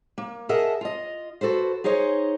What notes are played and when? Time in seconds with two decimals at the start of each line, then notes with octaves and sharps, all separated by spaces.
0.18 A#3
0.49 G#4 A#4 D#5 E5 F#5 A5
0.81 F4 D#5
1.41 F#4 A4 B4 C5
1.84 D#4 G#4 C5 C#5 D#5